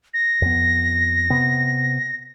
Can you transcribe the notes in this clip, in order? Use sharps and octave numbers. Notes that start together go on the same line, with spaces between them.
A#6
F2 B3
C3 B3